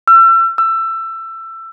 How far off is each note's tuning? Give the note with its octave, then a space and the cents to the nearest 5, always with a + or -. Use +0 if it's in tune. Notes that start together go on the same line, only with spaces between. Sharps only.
E6 +35
E6 +20